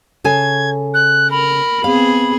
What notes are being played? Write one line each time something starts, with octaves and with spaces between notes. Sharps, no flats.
C#3 A4 G#5 G#6
F#6
A#4 B5
B3 C4 G#4 F5